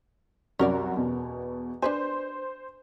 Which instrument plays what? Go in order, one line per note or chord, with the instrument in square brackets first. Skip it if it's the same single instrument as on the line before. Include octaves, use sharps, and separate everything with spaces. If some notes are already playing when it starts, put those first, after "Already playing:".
[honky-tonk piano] C2 F#2 F#4 [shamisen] C#4 A#4 D5
[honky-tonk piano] E2 B2
[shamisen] D4 B4 G#5 [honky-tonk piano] C5